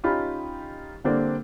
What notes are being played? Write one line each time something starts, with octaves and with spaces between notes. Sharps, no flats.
C#4 D#4 F4 G4 C#5 B5
D3 G3 A#3 C4 D4 A4